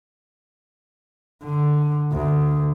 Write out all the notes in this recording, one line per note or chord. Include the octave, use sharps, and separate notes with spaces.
D3
D2